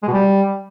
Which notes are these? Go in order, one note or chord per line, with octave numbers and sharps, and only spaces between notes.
G#3
B2
G3